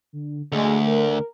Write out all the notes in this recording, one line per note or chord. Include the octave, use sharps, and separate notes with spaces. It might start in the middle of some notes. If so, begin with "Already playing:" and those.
D3
D2 G#3 A3
A#4